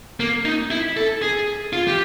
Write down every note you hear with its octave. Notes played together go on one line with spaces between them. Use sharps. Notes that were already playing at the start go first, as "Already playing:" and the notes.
A#3
D#4
E4
A4
G#4
F4
G4